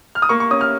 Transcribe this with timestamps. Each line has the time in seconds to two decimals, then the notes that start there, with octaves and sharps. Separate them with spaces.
0.15 F6
0.22 D#6
0.29 A#3 C#6
0.40 C#6
0.51 C#4 D#6
0.61 F6